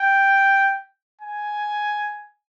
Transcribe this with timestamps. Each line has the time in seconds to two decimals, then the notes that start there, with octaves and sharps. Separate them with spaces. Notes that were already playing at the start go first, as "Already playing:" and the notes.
Already playing: G5
1.21 G#5